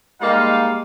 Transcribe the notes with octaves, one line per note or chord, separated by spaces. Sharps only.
G3 G#3 A#3 D#4 F5